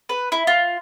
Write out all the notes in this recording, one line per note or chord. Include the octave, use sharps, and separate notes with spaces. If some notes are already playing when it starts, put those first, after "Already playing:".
B4
E4
F4